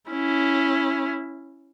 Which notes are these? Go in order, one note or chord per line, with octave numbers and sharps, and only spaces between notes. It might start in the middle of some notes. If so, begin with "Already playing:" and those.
C#4 E4